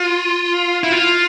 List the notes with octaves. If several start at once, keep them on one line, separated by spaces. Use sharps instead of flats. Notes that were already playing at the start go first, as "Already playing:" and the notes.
Already playing: F4
E4
F4